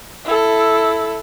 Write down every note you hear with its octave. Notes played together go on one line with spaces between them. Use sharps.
E4 A4